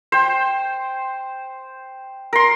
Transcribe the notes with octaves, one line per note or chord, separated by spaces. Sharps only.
C5 G5
A#4 C6